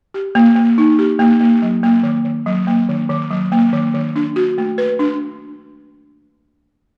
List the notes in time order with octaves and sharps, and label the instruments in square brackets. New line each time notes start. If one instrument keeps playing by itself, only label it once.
[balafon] G4
A#3
A#3
D#4
G4
A#3
A#3
F#3
A#3
D#3
D#3
F#3
A#3
D#3
D#3
F#3
A#3
D#3
D#3
D4
F#4
A3
B4
D4